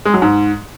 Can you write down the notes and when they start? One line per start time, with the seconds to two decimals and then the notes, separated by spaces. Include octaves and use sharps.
0.05 G#3
0.14 F#3
0.22 G#2